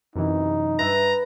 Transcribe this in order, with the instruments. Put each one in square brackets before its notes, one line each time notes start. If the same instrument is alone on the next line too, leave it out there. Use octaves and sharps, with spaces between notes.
[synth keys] F#2 C3 E3 [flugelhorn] D#4
[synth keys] G2 E5 A#6 [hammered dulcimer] B4 [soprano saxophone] A#5